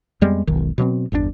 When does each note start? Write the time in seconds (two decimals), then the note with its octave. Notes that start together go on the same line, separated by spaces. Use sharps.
0.21 F2 G3 G#3 B3
0.47 E1 B1 D#3
0.78 B2 F#3 A#3 C4
1.12 G1 E2 D3 D4